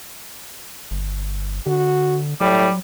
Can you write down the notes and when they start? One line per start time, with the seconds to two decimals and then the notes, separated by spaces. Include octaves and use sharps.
0.91 G1
1.66 D3 F#4
2.41 A2 F#3 G3